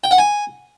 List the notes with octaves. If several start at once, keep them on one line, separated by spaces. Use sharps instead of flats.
G5
F#5
G#5